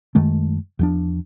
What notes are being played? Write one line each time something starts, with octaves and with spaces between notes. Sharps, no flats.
F#2 D#3 G#3 A3
E2 F3 D4